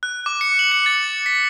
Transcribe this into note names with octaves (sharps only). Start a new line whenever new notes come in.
F#6
D6
C#7
F#7
C#7
A6
B6